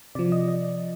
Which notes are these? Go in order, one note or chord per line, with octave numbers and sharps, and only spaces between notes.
C3 F3 D5
D#5
D#5